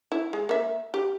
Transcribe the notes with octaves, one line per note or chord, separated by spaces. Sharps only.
E4
G#3
A#3 E5
G4